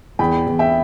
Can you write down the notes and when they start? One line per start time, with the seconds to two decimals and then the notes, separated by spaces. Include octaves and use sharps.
0.19 E2 G5 B5
0.47 E2
0.59 E5 G5